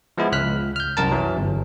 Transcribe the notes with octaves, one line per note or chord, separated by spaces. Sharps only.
F3 G#3 B3 E4
C#2 F6 F#6 B6
F6 G6
C2 F#2 A#4 A5
E3 F#3
G1